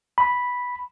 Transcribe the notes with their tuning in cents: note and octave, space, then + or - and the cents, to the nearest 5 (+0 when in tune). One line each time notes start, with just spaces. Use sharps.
B5 -5